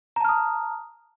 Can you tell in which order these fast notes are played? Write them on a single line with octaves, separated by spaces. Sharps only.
A#5 A5 F6 D#6